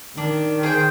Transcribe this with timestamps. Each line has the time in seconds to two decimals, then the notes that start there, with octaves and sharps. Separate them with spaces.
0.17 D#3 D4
0.63 G#4 C5 G5